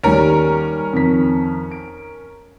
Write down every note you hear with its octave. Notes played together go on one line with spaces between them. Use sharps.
D#2 D#3 G3 C#4 A#4
F2 D#3 B6
D7